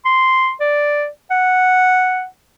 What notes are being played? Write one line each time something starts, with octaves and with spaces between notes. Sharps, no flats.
C6
D5
F#5